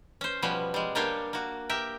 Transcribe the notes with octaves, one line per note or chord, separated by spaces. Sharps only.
C#4 C5
B2 F3 G3 B3 C#4 F5
G3 G#3
G3 A#3 D4 G4 C#5 F5
A#3 F#4
G4 A#4 E5 G5